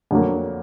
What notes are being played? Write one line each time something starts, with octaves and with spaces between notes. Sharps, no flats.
F2 D3 F#3 A#3